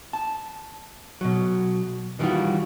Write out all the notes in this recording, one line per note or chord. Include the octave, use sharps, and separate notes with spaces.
A5
B2 F#3
D#3 E3 G3 D#4 F4 F#4